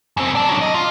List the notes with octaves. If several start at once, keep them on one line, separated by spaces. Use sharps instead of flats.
F#2 C4
D5 A5
F#3 D4
D#5
F4